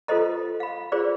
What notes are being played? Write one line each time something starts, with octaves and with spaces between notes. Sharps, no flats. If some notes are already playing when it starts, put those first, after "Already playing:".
F4 A4 B4 C5 D#5 A#5
F5 B5
F4 G#4 B4 C5 D5